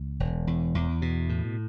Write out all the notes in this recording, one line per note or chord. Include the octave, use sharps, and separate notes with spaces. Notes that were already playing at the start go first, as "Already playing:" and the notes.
Already playing: C#2
E1
E2
E2
B2
A2